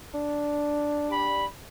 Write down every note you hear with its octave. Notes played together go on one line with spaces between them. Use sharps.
D4
G4 D5 B5